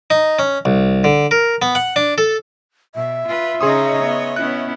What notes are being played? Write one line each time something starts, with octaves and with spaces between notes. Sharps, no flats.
D#4
C#4
C2
D3
A#4
B3
F#5
D4
A4
B2 E5
F4 B4
C#3 C#4 D#4 G#4 C#5 D#5 C6 D#6
B3
B3 C#4 E4 F#6